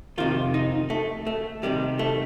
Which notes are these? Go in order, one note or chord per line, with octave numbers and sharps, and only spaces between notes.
F2 C3 D#3 F4
D#4
A3
A3
C2 C3 D#3 G3
A3